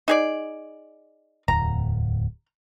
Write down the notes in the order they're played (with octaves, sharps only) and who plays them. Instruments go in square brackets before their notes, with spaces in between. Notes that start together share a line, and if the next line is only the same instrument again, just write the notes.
[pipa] D#4 G#4 D5
[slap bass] D1 E2 A2 [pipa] A#5